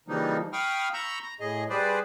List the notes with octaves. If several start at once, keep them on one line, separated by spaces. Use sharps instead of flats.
C#3 E3 F3 G3 A#3 D#4
F5 G5 B5 C#6 D#6 F6
A#5 B5 C#6 E6 G6
A#5
A2 G#4 D#5
G3 G#4 B4 C5 D5